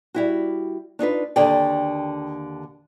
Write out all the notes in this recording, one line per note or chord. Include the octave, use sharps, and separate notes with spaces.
G3 E4 F#4
D4 D#4 F4 B4
D#2 D3 G#4 D5 G5